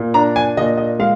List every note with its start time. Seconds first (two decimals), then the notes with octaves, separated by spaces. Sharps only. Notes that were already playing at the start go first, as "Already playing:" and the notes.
Already playing: A#2
0.14 D4 A#5
0.36 G#5
0.57 A#2 D#5
0.77 D#5
0.99 G#3 F5